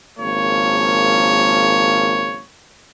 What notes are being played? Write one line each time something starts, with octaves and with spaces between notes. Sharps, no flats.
G#1 C#3 F3 A#3 C#5